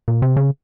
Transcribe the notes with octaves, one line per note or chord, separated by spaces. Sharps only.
A#2
C3
C#3